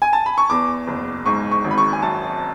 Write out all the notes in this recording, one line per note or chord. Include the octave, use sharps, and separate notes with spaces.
G#5
A5
B5
C#6
E2 D6
F#1
G#2 C#6
C#6
G#1
B5
C#6
G#5
F#2 A5